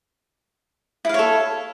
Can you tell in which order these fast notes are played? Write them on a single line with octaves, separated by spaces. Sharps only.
E4 F5 C#5 A4